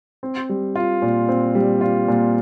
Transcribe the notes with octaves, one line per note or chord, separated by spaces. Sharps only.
C4
G3
F4
A#2
C4
G3
F4
A#2